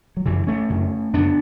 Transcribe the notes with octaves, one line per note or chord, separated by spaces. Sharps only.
F#3
F#2 C#3 E3
A3 C#4
F#2 C#3
F#2 C#3 B3 D4